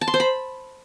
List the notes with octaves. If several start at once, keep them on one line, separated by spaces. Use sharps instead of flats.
A5
C6
C5
B5